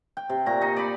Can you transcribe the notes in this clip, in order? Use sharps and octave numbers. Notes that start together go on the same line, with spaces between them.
G5
C3
A#2 A#5 C#6
D#4
D5 B5